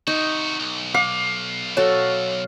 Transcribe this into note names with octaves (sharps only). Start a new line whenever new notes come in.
C3 D#4 F#4
B1
F5 D6
F#4 A4 C#5